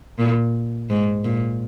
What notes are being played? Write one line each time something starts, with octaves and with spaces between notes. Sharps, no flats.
A#2
G#2
A#2